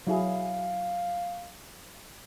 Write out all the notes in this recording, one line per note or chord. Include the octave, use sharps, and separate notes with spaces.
F#3 E4 G#4 F5